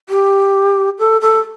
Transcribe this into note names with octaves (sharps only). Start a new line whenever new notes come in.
G4
A4
A4